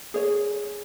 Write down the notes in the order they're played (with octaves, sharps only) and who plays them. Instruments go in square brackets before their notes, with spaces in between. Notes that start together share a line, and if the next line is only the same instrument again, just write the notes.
[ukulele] G#4 C#5